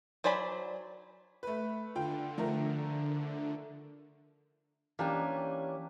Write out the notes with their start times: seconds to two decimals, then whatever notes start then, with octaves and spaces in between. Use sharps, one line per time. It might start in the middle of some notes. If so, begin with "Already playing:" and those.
0.24 F#3 C5 D5 G#5 B5
1.43 A3 B4
1.95 D3 F4 G5
2.38 F3 A3 A#4
4.99 E3 A#3 C#4 D4 G4